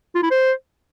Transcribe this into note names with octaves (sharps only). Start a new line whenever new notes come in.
F4
E4
C5